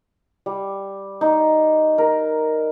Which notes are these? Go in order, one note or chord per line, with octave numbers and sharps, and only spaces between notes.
G3
D#4
A#4